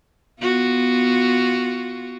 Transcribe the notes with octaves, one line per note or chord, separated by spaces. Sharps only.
B3 F4 F#4